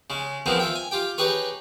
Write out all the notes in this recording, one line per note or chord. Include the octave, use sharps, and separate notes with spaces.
C#3 G#3
D#3 F3 G#3 B3 C4 D#4
F4 E5 G5
G#5
F4 G4 G5
D#4 G4 G#4 B4 C#5